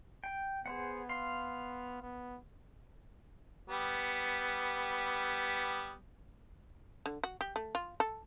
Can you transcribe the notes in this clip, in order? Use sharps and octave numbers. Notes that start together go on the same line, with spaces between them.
G5
B3 G#4 C5 F#5
F5 C6
B3
G3 B3
D3
F#4
G4
A3
F4
A4